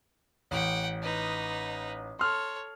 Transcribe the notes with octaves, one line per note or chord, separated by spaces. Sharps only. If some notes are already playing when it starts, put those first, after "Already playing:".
A1 F#5 G5
D#4 B4
A4 C#5 C6 F6